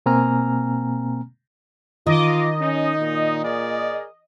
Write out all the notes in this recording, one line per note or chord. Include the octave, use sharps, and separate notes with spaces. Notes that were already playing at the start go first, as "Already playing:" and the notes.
B2 A#3 C4 G#5 A#5 F6
D#3 F4 D#5 D6
C#4 D#4
A#2
G#4 A#4 D5